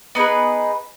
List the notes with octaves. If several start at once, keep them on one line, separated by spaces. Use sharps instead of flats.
B3 D#4 G#4 B4